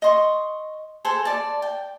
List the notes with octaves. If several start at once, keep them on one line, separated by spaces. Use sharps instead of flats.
D#5 C6 C#6
G#4 A4 C5
D5 A5
G5